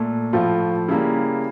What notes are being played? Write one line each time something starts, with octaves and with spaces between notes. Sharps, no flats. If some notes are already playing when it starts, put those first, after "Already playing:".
Already playing: A#2 A3
A2 F3 A3 F4
C#3 G3 A#3 E4